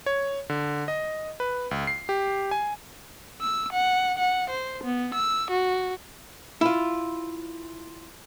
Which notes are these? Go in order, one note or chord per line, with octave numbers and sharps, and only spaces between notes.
C#5
D3
D#5
B4
C#2
C7
G4
G#5
E6
F#5
F#5
C5
B3
E6
F#4
E4 F4